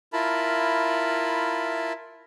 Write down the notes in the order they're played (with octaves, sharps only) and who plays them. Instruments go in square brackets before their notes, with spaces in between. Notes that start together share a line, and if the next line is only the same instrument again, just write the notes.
[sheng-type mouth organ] E4 F4 A#4 A5 B5